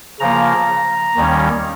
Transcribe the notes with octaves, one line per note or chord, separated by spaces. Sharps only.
C#3 F3 A#3 A#5
D#2 D#3 G3 C#4